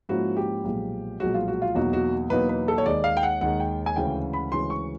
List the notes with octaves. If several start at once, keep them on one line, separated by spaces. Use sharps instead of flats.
G#2 F3 A#3 C#4 E4 F#4
G4
B1 A#2 F3 G#3
B1 A#2 F3 G#3 F#4
F4
F#4
F4
E2 B2 F#3 A#3 D#4 F#4
F#4
E2 B2 F#3 A#3 D#4 B4
B4
A4
C#5
D#2 D#3 G#3 D5
F5
G5
F#5
D#2 D#3 G#3 F#5
G5
G#5
D2 C#3 E3 G#3 C#4 G5
B5
D2 C#3 E3 G#3 C#4 C6
C#6